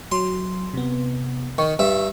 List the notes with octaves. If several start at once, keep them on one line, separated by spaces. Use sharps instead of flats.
F#3 C6
C3 B3
D#3 C#6
G2 E5